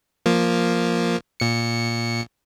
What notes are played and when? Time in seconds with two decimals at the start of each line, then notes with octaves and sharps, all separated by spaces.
0.26 F3 A#3
1.40 A#2 C#7